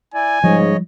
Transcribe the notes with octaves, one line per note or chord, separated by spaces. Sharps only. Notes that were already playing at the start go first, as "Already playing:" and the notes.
E4 D5 G#5
G#2 C#3 F3 G3 C#5 D#5